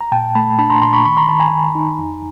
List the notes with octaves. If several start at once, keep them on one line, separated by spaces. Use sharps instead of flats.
A#5
A#2 G5 A5
A3 A5 B5
D4 A5 B5
A#5 C6
A#2 A#5 C6
B5 C#6
D#3 B5 C#6
A#5 C6
D#3 A5 B5
G#5 A#5
D#3
D#4
F2